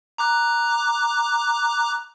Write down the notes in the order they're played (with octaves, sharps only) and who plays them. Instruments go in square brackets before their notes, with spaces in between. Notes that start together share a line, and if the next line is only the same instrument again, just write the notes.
[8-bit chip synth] A#5 D6 F#6